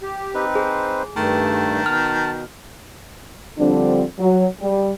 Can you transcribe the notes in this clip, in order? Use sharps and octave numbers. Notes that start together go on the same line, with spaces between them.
G4
C4 D#4 B4
G#4 C5
G2 D#3 A3 A5
B2 F6
D3 F3 G3 C4 D4
F#3
G3